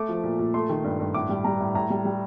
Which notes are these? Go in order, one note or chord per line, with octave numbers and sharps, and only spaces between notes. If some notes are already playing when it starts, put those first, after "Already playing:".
Already playing: A3 D6
F3
A#2
A#2
A3 C6
D#3
G2
G2
A2 D6
G3
G3 A#5
A2
A2 A#5
G3
G3